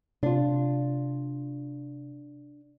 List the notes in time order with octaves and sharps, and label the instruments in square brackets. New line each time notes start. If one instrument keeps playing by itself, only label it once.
[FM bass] C3 [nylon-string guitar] D4 F4